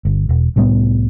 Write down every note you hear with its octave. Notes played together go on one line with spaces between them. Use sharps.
G1
E1
C2 A2 G3 B3